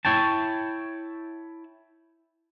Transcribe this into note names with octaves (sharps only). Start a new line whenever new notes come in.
E4 C#5 G5 A5